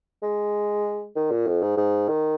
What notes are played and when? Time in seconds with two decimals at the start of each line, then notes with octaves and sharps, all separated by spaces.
0.23 G#3
1.16 D#3
1.31 A#2
1.47 F2
1.62 G#2
1.77 G#2
2.08 D#3